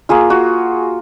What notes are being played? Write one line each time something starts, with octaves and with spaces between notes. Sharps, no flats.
A#3 F4 G#4
F#4